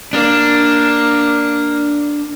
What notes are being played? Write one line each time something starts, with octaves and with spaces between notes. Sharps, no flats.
A#3 D4